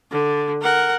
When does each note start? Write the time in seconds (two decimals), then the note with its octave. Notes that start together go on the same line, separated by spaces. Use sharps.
0.11 D3
0.62 A#4 F#5